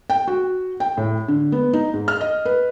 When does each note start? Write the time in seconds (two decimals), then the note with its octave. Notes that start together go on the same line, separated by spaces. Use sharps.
0.10 G5
0.28 F#4
0.80 G5
0.97 A2
1.28 D3
1.52 B3
1.73 D#4
1.94 G#2
2.08 F6
2.21 D#5
2.45 B4